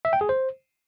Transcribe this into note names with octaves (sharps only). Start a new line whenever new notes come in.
E5
G5
G#4
C5